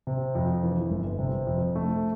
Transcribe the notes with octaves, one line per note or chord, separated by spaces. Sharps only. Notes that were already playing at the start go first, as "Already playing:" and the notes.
C3
F2
E3
G1
C3
F2
A3